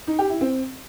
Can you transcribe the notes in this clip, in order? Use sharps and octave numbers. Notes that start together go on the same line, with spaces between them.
D#4
G4
E4
C4